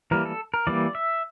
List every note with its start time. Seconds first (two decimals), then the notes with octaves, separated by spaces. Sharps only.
0.11 E3 G3 A#3 A#4
0.25 A4
0.54 A#4
0.67 E3 G3 A#3 D5
0.95 E5